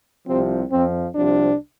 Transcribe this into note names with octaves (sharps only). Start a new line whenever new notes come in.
C2 C3 F3 C4
F2 F3 C4
C2 C3 F3 D4